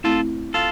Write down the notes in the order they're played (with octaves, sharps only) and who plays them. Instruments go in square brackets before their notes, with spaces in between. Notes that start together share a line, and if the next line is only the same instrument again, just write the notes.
[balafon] A3 C4 E4 [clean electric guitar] F4 A4
[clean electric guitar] F4 A4